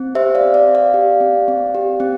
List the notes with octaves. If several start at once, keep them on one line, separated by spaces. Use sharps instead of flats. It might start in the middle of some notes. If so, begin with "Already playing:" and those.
Already playing: C4
G4 C5 E5
D5 F5
C4
D5
C4
D5 F5
G4
C4
C4
G4
C4